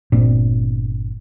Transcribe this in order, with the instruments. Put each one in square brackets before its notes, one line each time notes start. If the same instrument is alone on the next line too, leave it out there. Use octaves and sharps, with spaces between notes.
[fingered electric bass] G1 A#2 C4 D4